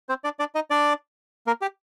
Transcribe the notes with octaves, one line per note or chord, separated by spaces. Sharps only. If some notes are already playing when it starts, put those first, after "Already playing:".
C4 C5
D4 D5
D4 D5
D#4 D#5
D4 D5
A#3 A#4
G4